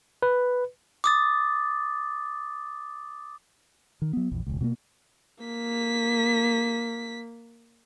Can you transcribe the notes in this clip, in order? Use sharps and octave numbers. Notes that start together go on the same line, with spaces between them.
B4
D6 D#6 A6
D#3
F#3 B3
A#1 E2
E1 C#2
B2 A3 A#3
A#3 B6